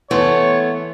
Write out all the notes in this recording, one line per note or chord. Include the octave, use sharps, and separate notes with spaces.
E3 A3 B3 C#5 C6 G#6